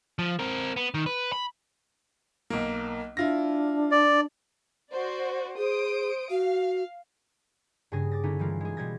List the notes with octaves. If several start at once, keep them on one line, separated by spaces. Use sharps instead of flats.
F3
C4 A#4
B3
D#3
B4
B5
B1 A#3
D4 E4 F4 A#6
D5
F#4 C5 D5
G#4 C5 D#6 D7
F#4 F5
G2 C#3 G#4 A#6
D6 A6 A#6
D3 B3 C#4 D#4 E4
E3 G3 A#3 F4
G#3 G#4
B2 G3 G#3 G#6 A#6